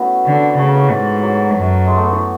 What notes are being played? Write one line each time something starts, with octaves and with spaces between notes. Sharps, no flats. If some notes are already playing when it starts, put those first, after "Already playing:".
Already playing: A3 B3 C#4 E4 F#4
D3
C#3 A3
F#3
E3
G#2
F#3
F#2
G#3
A3
B3
E3